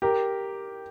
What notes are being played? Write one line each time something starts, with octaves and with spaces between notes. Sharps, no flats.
G4 A#4